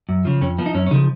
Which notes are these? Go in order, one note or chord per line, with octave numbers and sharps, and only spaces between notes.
F#2
C#3 F3
F2 C#4
F3 B3
D#4
F#2 C#4
C#4
C#3 F3 D#4